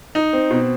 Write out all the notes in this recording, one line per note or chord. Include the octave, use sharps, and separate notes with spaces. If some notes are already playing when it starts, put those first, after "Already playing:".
D#4
C4
B2